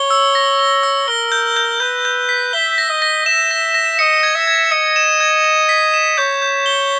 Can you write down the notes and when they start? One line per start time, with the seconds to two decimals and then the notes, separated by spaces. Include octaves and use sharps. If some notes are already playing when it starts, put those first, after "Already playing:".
Already playing: C#5 G7
0.10 E6
0.35 A#6
0.59 G7
0.83 E6
1.08 A#4 G7
1.32 G6
1.57 G6
1.80 B4 G6
2.05 G6
2.29 B6
2.53 E5 G7
2.78 A#6
2.89 D#5
3.02 A#6
3.26 E5 E7
3.51 A#6
3.74 A#6
3.99 D#5 C#7
4.23 G#6
4.35 E5
4.47 G#6
4.71 D#5 C#7
4.96 E7
5.20 G#6
5.44 E7
5.69 B6
5.94 E7
6.18 C#5 G6
6.42 G6
6.66 G7